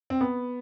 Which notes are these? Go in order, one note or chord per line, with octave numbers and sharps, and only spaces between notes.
C4
B3